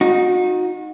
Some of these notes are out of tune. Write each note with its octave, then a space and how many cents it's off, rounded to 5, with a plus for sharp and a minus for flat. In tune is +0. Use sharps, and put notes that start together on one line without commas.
D#4 +0 F#4 -35